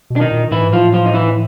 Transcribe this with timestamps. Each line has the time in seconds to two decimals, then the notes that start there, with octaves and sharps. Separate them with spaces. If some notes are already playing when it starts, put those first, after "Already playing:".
0.10 B2
0.16 D4
0.20 D#3 D#4
0.32 A#2
0.51 A2 E3 E4
0.61 G#2
0.72 A2 F3 F4
0.94 F3 F4
1.05 D#4
1.14 E3 E4